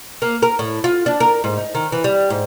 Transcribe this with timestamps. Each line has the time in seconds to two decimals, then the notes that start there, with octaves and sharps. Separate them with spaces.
0.22 A#3
0.42 A#4
0.59 A2
0.84 F4
1.06 D4
1.20 A#4
1.44 G#2
1.57 D#4
1.75 D#3
1.92 E3
2.04 G3
2.30 G#2